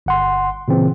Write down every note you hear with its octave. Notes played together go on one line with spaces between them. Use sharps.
G1 F#5 C6
A#2 C#3 E3 C4